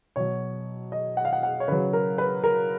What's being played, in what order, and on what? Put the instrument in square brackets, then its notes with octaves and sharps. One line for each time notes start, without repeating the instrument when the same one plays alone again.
[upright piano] B2 F#3 C#5
D#5
F#5
F5
F#5
F#5
C#5
C#3 F#3 B4
A#4
B4
A#4